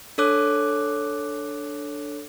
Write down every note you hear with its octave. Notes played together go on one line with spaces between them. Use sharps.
D4 A4 C#5 D6 F#6